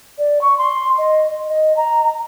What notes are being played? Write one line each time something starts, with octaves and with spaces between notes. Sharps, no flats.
D5
C#6
C6
D#5
D#5
A#5